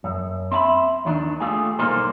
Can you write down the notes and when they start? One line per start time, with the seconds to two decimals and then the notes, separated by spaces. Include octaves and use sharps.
0.04 F#2
0.52 C4 E5 A5 B5
1.05 D#2 D#3 D4
1.40 A3 F4 G4 G#4
1.79 B1 G3 A#3 D#4 C5